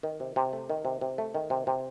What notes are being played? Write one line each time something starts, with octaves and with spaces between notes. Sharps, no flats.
D#3
C3
C3
A3
D#3
C3
C3
A3
D#3
C3
C3